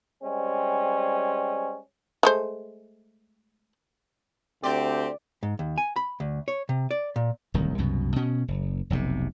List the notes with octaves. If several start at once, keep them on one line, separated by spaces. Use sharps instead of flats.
G3 G#3 C4 C#4
G#3 A3 C5
D2 C4 G4 D5
G#2
D#2
G#5
B5
D2
C#5
C3
D5
A#2
D1 C2 D#3
C2 F#2 B2
B2 C#4
F#1
F1 B1 A2 C3